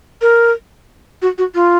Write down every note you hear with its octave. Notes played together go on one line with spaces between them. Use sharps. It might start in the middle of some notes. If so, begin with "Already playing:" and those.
A#4
F#4
F#4
F4